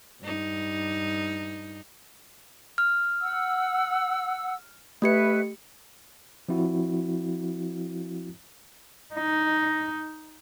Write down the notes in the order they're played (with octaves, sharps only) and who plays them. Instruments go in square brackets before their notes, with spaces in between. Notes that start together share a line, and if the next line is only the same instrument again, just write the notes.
[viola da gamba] G2 D#4
[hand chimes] F6
[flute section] F#5 E6
[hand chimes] A3 G4 C#7 [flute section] B4 E5
[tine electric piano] F3 C4 E4 F#4
[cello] D#4